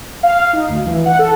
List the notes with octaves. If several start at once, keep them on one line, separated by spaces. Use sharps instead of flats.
F5
D#4
D2
E3
F#5
A4